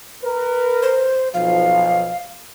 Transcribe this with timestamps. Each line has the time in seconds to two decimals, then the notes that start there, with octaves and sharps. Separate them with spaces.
0.24 A#4 B4
0.82 C5
1.34 B1 F3 F5